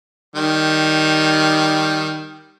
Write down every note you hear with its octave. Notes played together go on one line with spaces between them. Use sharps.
D#3 G3